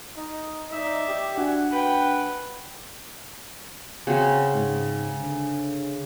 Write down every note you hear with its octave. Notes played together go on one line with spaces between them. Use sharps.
D#4
D#4 D5 E5
G4
D4 F#4 F#5 G#5
B4 G5
C#3 C4 F#4
G#2
D3